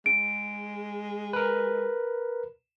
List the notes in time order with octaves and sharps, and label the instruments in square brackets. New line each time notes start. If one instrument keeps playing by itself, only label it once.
[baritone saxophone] G#3 [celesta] D7
[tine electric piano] A#4 B4